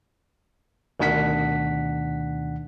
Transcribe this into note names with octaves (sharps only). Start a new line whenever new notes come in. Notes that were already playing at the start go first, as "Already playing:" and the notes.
D2 B2 D#3 D4 F#5 B6